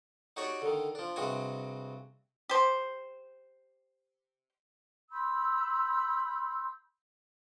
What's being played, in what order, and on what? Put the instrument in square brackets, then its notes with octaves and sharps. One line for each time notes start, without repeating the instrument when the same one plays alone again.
[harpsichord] D#4 F#4 G4 C#5 D5
D3 D#3
F3 D4
G2 C3 G#3 F#4 G#5
[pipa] G4 C5
[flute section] B5 C6 E6 G6